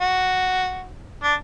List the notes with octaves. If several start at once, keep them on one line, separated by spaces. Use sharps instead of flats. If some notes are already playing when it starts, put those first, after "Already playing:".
F#4
D4